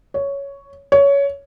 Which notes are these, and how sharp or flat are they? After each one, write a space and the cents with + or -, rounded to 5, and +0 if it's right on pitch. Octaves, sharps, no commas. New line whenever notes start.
C#5 +5
C#5 +15